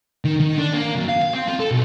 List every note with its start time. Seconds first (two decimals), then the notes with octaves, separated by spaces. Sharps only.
0.25 D#3
0.40 D#3
0.58 D4
0.73 A#3
0.96 F#2
1.09 F5
1.22 F5
1.33 C4
1.48 F4
1.60 A4
1.71 B1